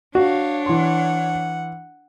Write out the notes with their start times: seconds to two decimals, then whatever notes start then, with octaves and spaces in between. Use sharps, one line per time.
0.15 D4 F#4 C#5 F5
0.66 E3 F#5 C6